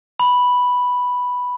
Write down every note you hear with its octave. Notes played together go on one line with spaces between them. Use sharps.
B5